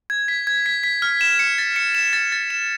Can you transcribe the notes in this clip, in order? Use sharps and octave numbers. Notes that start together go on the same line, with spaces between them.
G#6
B6
G#6
B6
B6
F6
E7
C#7
A6
C#7
E7
A6
A6
E7